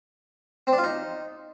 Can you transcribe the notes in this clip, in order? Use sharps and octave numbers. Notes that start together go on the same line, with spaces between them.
C4
D4
F4
D#4